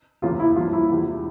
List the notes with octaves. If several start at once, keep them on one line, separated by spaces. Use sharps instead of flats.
F1 E2 C#3 F3 A#3 F4
E4
G2 F3 A#3 F4
E4
E1 E2 C3